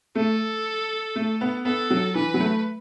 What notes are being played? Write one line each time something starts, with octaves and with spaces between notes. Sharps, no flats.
A3 A4
A3
B3
B3 A4
F#3
E3 B4
F#3
A3